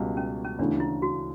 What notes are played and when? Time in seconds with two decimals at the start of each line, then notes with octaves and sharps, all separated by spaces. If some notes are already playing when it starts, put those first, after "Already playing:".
Already playing: C#2 B2 G3
0.17 C#4
0.45 C#4
0.59 D2 C#3 E3 A3 D4
0.80 E4
1.02 F#4